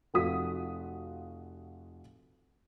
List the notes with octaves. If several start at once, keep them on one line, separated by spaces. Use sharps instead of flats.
F1 F4 F#4 D#6 B6